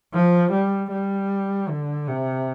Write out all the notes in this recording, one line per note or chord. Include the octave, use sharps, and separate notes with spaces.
F3
G3
G3
D3
C3